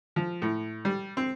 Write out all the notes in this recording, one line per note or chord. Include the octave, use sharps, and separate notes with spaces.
F3
A2
G3
C4